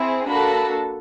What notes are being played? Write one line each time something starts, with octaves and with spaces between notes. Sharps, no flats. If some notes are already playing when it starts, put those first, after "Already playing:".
Already playing: C4 E4 G#4
A#3 D4 F#4 A4 A5 B5